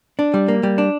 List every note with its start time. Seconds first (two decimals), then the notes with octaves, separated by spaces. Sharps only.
0.19 D4
0.34 G3
0.48 A#3
0.63 G3
0.78 D4